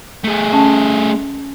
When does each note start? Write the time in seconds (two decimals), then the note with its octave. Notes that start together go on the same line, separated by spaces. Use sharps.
0.24 A3 G#4
0.53 C#4 A5